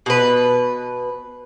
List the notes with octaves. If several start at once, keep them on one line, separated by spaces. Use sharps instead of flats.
B2 B4